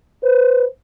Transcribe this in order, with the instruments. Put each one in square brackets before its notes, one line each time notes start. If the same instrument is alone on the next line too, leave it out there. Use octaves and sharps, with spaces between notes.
[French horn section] B4 C5